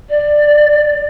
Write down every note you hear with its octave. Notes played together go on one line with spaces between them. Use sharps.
D5